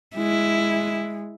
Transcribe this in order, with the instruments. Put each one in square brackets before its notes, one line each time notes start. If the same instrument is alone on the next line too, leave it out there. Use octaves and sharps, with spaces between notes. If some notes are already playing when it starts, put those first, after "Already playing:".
[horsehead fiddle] G#3 [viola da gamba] E4